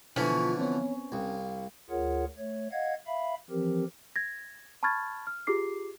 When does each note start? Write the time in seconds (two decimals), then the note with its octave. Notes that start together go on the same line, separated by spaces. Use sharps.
0.16 B2 D3 E3 F3 B3 C#4 F4
0.59 B3 C4 C#5
1.12 C2 F5
1.90 D2 F4 G#4 A#4 C#5 F#5
2.38 A3 C#5
2.72 D#5 F5 F#5 G#6
3.07 E5 F5 B5
3.51 E3 F3 C4 G4 A#4
4.16 G#6 A#6
4.83 A5 B5 C#6 F6 G#6 A6
5.27 F6
5.47 F4 G4 G#4 D6 C7